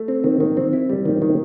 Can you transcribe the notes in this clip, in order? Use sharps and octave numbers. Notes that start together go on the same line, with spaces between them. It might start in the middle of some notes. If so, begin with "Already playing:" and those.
Already playing: A3
C4
D#3
D#3
C4
E4
G3
D#3
D#3